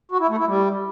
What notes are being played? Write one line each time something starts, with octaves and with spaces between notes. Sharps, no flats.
F#4
E4
A3
E4
G3